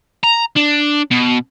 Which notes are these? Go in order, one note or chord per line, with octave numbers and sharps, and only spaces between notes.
A#5
D4
B2